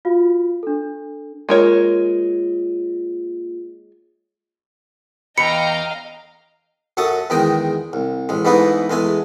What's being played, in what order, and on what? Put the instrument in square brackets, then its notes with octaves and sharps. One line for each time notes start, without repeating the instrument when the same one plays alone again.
[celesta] F4 F#4 F5
D4 A4
[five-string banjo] G#3 A#4 C#5 [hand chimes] A#3 F4
[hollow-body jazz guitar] E2 E3 B5 [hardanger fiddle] D#5 F5 [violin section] G5 A#5 [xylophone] C#7
[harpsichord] F#2 F#3 A4 A5 C#6 D#6
E2 D#3 G#3 D#4 G5
C2
A1 G#3
G#2 E3 A3 B3 D#4 B4
E2 G#3 A3 G#5